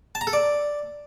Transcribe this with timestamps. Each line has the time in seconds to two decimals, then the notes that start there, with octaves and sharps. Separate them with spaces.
0.15 A5
0.21 A#5
0.27 A4
0.33 D5